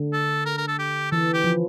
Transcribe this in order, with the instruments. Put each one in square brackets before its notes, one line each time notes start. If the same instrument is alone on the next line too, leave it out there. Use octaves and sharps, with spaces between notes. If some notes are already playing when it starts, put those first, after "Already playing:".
Already playing: [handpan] D3
[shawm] A4
A#4
A#4
A4
G4
[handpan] E3 [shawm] A4
[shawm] G4
[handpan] F3